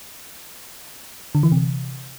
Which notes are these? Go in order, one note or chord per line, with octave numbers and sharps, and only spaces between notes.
D3
E3
C3